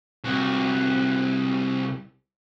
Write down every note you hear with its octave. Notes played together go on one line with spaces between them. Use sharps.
C2 F#4